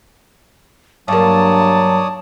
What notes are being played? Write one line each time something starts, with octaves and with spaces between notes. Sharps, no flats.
G2 F#3 A#3 C#5 D5 A5 D#6